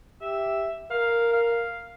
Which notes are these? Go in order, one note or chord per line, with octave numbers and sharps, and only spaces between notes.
G4 E5
A#4 F5
F5